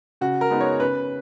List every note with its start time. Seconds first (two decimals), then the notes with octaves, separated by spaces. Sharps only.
0.21 C#3 F#4
0.41 A#4
0.50 G#3 B3 D#4
0.61 C#5
0.80 C#3 B4